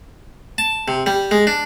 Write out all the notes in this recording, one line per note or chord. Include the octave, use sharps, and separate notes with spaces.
A5
C3
G3
G#3
D4